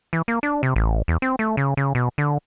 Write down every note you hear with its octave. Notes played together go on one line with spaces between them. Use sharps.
E3
A#3
D4
C3
A1
E2
C4
A3
C#3
C#3
B2
D3